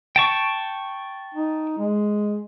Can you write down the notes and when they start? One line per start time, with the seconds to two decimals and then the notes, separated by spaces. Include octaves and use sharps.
0.16 G5 A5 C#6
1.35 D#4
1.78 G#3